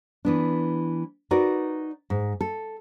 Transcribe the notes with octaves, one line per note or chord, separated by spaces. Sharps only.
E3 B3 D4
D#4 F#4 A#4 B4 D5
G#2
A4